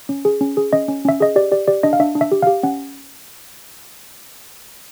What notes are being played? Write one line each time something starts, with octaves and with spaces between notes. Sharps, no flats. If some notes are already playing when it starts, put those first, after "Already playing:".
C#4
G#4
C#4
G#4
C#4 D#5
C#4
C#4 E5
G#4 D#5
G4 D5
G4 D5
G4 D5
D4 D#5
F5
D4 E5
D4
E5
G4
G4 F5
C#4 F#5